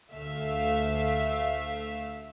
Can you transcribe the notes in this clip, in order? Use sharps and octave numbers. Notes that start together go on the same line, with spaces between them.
D2 A3 E5 F5